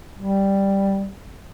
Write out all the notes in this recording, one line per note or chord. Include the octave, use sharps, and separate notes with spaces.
G3